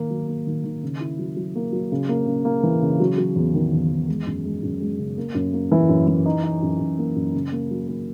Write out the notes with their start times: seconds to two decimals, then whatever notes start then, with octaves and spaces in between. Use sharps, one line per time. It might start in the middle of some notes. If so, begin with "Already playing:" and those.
Already playing: D#3 A#3
0.10 F#3
0.28 A#3
0.47 D#3
0.64 D#3
0.83 C#3
1.01 E4
1.19 F#3
1.37 F#3
1.55 A#3
1.72 F#3
1.92 C#3
2.09 A#3
2.27 C#3
2.45 A#3
2.63 E3
2.82 C#3
3.00 F#3
3.18 F#3
3.36 E2
3.54 D#3
3.72 E2
3.90 E2
4.08 G#3
4.27 F#2
4.45 G#3
4.63 F#2
4.80 G#3
4.99 C#3
5.18 A#3
5.35 F#2
5.53 A#3
5.72 E3
5.89 F#2
6.08 E3
6.26 D#4
6.44 D#4
6.62 F#2
6.79 F#2
6.98 A#3
7.16 F#2
7.34 C#3
7.52 A#3
7.71 F#3
7.88 A#3